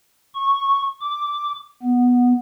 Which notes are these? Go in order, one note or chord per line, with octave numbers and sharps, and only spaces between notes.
C#6
D6
B3